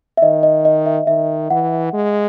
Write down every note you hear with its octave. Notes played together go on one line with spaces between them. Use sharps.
E5
D#3 D#5
D#5
D#5
E5
D#3 E5
E3 F#5
G#3